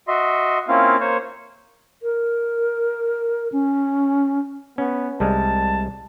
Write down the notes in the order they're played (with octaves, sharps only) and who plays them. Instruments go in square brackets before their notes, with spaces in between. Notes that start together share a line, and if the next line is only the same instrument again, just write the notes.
[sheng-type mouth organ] F#4 D#5 E5 C6
A#3 C4 C#4 E4 F4 F5
A#3 C5 C#5
[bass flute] A#4
C#4
[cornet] B3 [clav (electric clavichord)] C#4
[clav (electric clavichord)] C2 G3 G#3 [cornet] A5